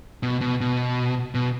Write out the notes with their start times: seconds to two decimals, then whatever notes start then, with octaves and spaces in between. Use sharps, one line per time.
0.23 B2
0.41 B2
0.61 B2
1.35 B2